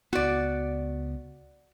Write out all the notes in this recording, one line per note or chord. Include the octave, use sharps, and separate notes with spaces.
C#2 B3 F#4 D5